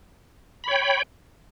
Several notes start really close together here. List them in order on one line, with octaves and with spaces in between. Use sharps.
B5 C#5 G5